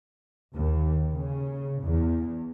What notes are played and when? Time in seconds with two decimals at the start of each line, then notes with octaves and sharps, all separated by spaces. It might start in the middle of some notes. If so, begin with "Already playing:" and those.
0.53 D#2
1.12 C#3
1.80 E2